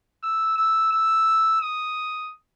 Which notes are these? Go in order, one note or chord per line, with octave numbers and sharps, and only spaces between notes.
E6
E6
E6
D#6